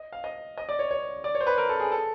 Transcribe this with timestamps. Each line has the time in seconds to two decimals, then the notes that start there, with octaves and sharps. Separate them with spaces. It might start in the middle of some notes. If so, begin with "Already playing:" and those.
Already playing: D#5
0.12 F5
0.24 D#5
0.58 D#5
0.69 D5
0.79 C#5
0.91 C#5
1.24 D5
1.35 C#5
1.41 C5
1.47 B4
1.58 A#4
1.69 A4
1.80 G#4
1.92 A4